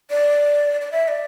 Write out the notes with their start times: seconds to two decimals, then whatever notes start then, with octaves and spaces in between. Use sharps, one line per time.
0.10 D5
0.81 D5
0.92 E5
1.08 D5